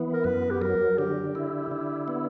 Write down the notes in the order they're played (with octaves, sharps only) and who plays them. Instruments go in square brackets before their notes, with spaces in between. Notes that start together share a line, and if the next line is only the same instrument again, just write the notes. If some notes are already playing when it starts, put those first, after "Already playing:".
Already playing: [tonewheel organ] E3 B3
[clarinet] A#4
[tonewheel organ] F#2 [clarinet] B4
[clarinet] G4
[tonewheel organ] F#3 [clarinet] A#4
[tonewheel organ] D3 [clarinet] G4
[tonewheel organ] E4
D3
B3